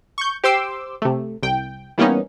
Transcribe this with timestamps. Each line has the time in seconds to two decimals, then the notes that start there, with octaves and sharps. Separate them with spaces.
0.18 C#6 G6
0.44 G4 C5 C6 D6 E6
1.02 C3 A3
1.43 C2 G5
1.98 E3 G3 A#3 B3 C#4 D#4